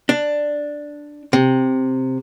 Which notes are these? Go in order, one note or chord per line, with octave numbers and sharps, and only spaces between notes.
D4
C3